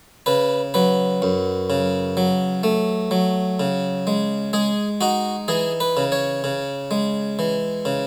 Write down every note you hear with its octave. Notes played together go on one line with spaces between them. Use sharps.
C#3 B4
F#3 B4
F#2
C#3
F#3
A3
F#3
C#3
G#3
G#3 G#4
D#4 F#4
E3 G#4
B4
C#3
C#5
C#3
G#3
E3
C#3